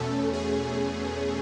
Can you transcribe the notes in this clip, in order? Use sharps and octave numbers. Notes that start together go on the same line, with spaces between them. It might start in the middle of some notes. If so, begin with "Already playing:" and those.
Already playing: E2 B2 A3 C#4 A4
G#4